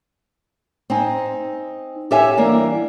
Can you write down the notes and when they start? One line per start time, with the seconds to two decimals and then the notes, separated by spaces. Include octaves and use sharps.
0.90 C4 D#4 G#5
2.11 G4 A4 C#5 E5 F5 G#5
2.37 E3 G3 A#3 D4